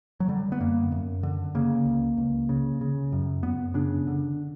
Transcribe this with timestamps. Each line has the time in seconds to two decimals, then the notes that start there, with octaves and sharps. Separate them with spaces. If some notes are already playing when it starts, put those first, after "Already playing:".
0.20 F#3
0.28 D3 G3
0.52 B3
0.60 F#2 A#3
0.92 F#2
1.23 D3
1.55 C#3 A#3
1.86 C#2
2.17 C#2
2.49 C#3
2.81 C#3
3.12 F#2
3.43 F#2 B3
3.74 C#3 D4
4.07 D3